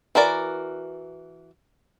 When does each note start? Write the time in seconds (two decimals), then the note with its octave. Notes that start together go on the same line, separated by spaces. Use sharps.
0.15 E3 F#4 A#4 D5